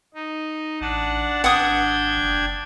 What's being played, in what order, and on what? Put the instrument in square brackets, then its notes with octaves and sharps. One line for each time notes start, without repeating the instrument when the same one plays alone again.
[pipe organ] D#4
[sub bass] A1 [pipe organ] D4 F#5 A5
[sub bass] G#1 [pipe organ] D4 G5 G#6 [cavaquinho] F#5 D#6
[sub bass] F#1